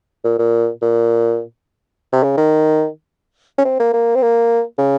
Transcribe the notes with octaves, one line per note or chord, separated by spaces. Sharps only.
A#2
A#2
A#2
C3
C#3
D#3
C#4
C4
A#3
A#3
C4
A#3
C#3